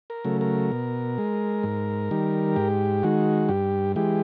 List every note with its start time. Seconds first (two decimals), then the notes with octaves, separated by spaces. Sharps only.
0.10 A#4
0.25 C#3 F#3 A3
0.41 A#4
0.72 B2
1.18 G#3
1.63 G#2
2.11 D#3 G3
2.56 G#2 G4
3.03 D#3 G#3 F#4
3.49 G2 G4
3.96 E3 G#3 G4